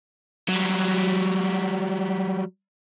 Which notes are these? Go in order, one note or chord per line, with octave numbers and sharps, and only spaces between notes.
F#3 G3